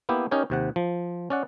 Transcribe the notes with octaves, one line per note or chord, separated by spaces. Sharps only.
A#3 B3 E4 G4
C#4 D#4 G4 A#4 C#5
D#2 C3 F#5
F3
C#4 D5 F#5